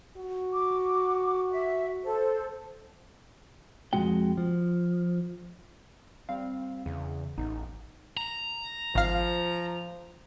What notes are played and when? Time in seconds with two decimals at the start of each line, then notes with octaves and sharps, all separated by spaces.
0.17 F#4
0.53 D6
1.51 E5
2.04 A4 C5
3.93 F2 F3 G#3 F#4 G5
4.37 F3
6.29 G3 C4 F5
6.86 E2 C#3
7.38 A1 B3 D#4
8.17 A#5
8.95 G#1 F3 F5